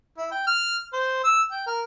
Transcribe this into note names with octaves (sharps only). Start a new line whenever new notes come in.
E4
G5
F6
C5
E6
G5
A#4